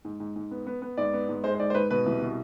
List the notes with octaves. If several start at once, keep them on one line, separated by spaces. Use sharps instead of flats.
G#2
G#2
G#2
B3
B3
B3
G#2 D5
B3
G#2
G#3 C5
C5
G#2 D5
C5
G#2 B4
B2 B4
C2
B2